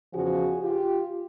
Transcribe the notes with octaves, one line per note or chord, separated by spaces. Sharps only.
E2 C#3 F3 F#4 G#4
F4 G4